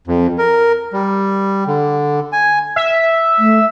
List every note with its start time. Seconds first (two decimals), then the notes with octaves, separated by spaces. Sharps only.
0.07 F2
0.38 A#4
0.93 G3
1.67 D3
2.32 G#5
2.76 E5
3.39 A3